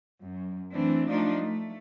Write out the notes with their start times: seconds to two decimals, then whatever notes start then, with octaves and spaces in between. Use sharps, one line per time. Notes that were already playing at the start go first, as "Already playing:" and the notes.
0.24 F#2
0.74 E3 A3 C4 D4
1.09 F3 A3 D4 D#4 F4
1.41 A3